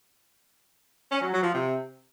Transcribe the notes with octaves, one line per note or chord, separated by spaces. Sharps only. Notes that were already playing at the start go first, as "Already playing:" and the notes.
C#4
F#3
F#3
F3
C3